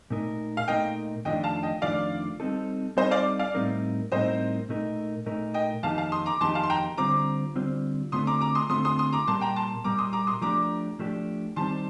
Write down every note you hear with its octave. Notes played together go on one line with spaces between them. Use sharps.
A#2 A3 D#4 A#4
F5
A#2 A3 D#4 A#4 D#5 G5
F2 D#3 A3 D4 F4 D#5 G5
F5 A5
D#5 G5
F2 D#3 A3 D4 F4 D5 F5
G3 C4 D#4 A4
G3 C4 D#4 A4 C5 D#5
D5 F5
D5 F5
A2 G3 C4 D#4 A#4
A2 G3 C4 D#4 A#4 C5 D#5
A#2 A3 D#4 A#4
A#2 A3 D#4 A#4
D#5 G5
F2 D#3 A#3 D#4 G4 F5 A5
F5 A5
C6 D#6
A#5 D6
F2 D#3 A#3 D#4 G4 A5 C6
F5 A5
C6
G5 A#5
D3 G3 C4 F4 C5 A#5 D6
D3 G3 C4 F4 C5
D3 A3 C4 F4 A4 C6 D#6
A#5 D6
A#5 D6
C6 D#6
D3 A3 C4 F4 A4 C6 D#6
C6 D#6
C6 D#6
A#5 D6
A#2 G3 A#3 A5 C6
G5 A#5
A5 C6
A#2 G3 A#3 A#5 D6
C6 D#6
A#5 D6
C6 D#6
F3 A3 D4 G4 A#5 D6
F3 A3 D4 G4
D#3 G3 C4 A5 C6